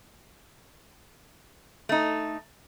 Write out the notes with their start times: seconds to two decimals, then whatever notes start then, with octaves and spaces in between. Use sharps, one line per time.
1.89 A3 D#4